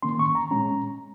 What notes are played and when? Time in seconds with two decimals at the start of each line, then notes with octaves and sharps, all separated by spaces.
0.02 D#3 A#3 C#4 C6
0.19 C#6
0.35 A#5
0.51 A#2 G#3 C#4 A#5